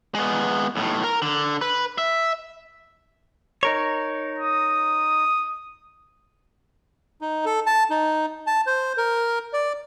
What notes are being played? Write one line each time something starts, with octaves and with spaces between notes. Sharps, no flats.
G#3 B3
B1 A2
A#4
D3
B4
E5
D#4 A#4 C#5
D#6
D#4
A4
A5
D#4
A5
C5
A#4
D5